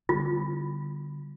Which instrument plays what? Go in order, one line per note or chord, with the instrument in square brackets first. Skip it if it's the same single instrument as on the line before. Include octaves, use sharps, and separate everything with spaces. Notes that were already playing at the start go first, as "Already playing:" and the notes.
[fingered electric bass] D3 G3 B3 [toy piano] F4